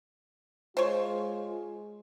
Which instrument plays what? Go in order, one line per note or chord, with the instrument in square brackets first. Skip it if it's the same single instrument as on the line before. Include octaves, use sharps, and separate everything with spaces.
[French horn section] G#3 F4 [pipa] C5 C#5